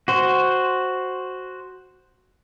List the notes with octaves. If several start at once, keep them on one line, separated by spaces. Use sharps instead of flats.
F#4 C5